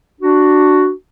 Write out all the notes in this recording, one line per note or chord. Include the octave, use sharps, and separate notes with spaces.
D4 F#4